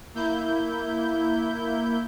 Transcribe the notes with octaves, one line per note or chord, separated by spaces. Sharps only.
A#3 E4 G6